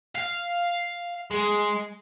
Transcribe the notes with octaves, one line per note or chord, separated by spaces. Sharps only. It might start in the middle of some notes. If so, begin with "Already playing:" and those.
F5
G#3